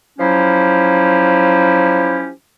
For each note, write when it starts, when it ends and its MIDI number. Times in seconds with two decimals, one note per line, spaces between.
0.19 2.30 53
0.19 2.30 54
0.19 2.30 61
0.19 2.30 64
0.19 2.30 67